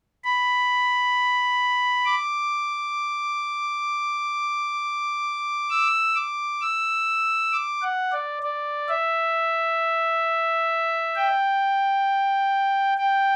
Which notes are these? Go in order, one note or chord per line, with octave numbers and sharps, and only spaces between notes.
B5
D6
E6
D6
E6
D6
F#5
D5
D5
E5
G5
G5